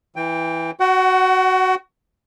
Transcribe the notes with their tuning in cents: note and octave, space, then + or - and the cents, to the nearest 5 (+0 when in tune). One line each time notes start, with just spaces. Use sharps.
E3 +0 G5 +15
F#4 +5 F#5 +35